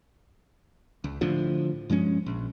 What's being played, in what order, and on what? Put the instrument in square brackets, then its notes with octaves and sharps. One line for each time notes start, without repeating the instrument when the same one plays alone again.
[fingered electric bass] C#2
A2 D3 F3
G2 F3 G#3 C#4
A#1